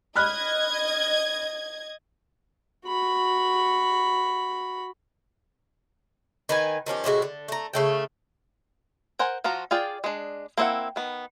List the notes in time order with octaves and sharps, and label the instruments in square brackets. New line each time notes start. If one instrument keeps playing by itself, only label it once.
[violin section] D#5 G#6 [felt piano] B5 F6 F#6
[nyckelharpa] F#4 B5
[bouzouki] D#3 B4 G#5
D#3 F3 C#4 G4
A2 C3 G#3 F#4
D3
A3 A#5
C#3 A3 G5
[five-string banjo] A#4 C5 F#5 G#5
F3 F4 F#4 A#5
F4 G#4 D5 G5
G#3 D4
A#3 C4 E4 D5 F#5
D#3 B3